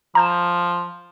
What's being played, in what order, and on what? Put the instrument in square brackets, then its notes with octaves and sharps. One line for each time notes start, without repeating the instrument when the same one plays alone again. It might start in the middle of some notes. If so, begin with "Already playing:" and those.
[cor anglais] F3 [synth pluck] A#5 G6 E7